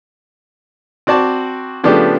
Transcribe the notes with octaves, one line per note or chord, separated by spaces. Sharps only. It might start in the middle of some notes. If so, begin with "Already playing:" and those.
C4 F#4 D5 A5
C#3 F3 A3 B3 D4 G4